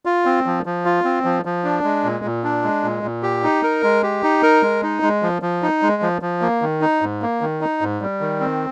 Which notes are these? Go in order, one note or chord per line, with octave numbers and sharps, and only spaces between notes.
F4
C4
F3
F3
F4
C4
F3
F3
D4
G#3
A#2
A#2
D4
G#3
A#2
A#2
G4
D#4
A#4
G#3
G4
D#4
A#4
G#3
D#4
G#3
F3
F3
D#4
G#3
F3
F3
A#3
D#3
D#4
G#2
A#3
D#3
D#4
G#2
G3
D#3
C4